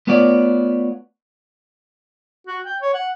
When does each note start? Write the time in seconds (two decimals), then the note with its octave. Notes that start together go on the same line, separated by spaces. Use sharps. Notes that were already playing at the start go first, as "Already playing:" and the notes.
0.07 A3 B3 F4 F#4 C#5 D5
2.47 F#4
2.65 G5
2.82 C#5
2.94 F#5